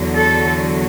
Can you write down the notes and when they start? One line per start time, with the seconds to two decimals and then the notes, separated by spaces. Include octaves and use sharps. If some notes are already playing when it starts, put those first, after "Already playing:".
Already playing: E2 D3 F#3
0.15 A4